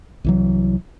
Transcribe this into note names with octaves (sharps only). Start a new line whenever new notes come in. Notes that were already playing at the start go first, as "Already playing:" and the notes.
C2 E3 F#3